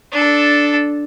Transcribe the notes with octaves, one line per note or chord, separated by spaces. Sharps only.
D4 A4